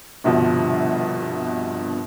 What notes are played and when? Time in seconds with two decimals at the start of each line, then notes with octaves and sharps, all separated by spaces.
0.24 G1 C2 G2 B2 F3